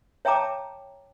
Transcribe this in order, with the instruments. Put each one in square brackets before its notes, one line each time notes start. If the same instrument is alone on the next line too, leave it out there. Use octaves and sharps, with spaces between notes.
[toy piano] C#5 E5 G5 A5 A#5 D6